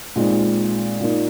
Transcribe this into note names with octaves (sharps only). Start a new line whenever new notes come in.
A#2 G#3 C4 D#4
A#2 A#3 D#4